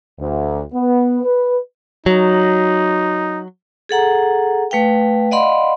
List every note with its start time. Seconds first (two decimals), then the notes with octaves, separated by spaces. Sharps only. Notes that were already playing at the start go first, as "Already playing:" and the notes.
0.19 D2
0.73 B3
1.24 B4
2.06 F#3 D#4
3.89 G#4 A4 F#5 A#5
4.71 A3 B4 F5 G5
5.31 D5 D#5 F5 F#5 B5 C6